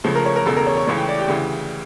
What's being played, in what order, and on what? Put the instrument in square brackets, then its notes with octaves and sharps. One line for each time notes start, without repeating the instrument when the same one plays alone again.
[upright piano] C#2 C#3 F3 A3
A#4
C#5
A#4
E1 E2 C#3 A4
A#4
C#5
C#5
C#2 C#3 E3 A3 C#5
G5
D5
G4
D2 C#3 E3